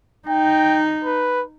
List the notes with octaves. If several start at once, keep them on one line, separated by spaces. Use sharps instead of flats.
D#4 G5
B4